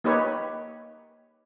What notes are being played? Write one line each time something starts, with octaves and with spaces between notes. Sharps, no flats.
A#3 D#4 G4 B4 C#5